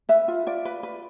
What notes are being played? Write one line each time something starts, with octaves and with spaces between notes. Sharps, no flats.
B4 E5
F4
F4 D5
B4
B4